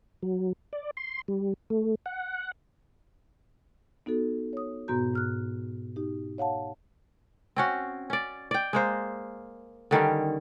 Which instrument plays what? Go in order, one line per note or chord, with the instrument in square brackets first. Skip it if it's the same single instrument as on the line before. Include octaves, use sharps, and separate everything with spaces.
[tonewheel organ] F#3
D5
C6
G3
A3
F#5
[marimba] B3 D#4 F#4 A4
C#5 D#6
G#2 B2 B3 F#4 A#5 G6
G#2 F6 F#6
D#4 G4
C#5 F5 F#5 A5
[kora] C4 C#4 F#4
C#4 D5
D5 G5
G#3 A#3 C5
D3 D#3 G3 C#4